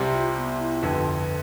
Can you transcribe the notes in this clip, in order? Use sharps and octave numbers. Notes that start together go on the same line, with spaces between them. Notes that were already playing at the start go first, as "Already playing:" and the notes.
Already playing: C2 C3 G3 G4
F4
B3
F4
E4
F4
G1 F2 D3 B4